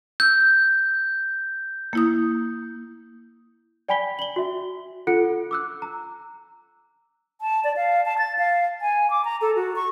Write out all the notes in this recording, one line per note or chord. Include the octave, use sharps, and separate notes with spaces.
E6 G6
A#3 E4 D#6
D5 G5 G#5 B5 B6 G7
F#7 G7
F#4 E5
F4 A4 F#5 F#6 C#7
D6 E6 F#6
A#5
A5
D5
F5
A5
A6
F5
G#5
D6
A#5
A4
F#4
C#6